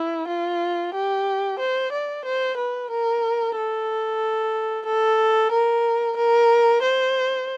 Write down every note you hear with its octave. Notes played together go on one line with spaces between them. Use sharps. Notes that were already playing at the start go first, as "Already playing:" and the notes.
Already playing: E4
F4
G4
C5
D5
C5
B4
A#4
A4
A4
A#4
A#4
C5